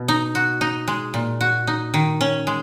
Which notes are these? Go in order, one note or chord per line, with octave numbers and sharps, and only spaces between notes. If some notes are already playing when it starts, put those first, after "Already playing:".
Already playing: B2
D#4
F#4
D#4
G#3
A#2
F#4
D#4
D#3
C#4
G#3